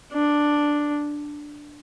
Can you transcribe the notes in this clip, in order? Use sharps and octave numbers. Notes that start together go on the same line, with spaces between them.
D4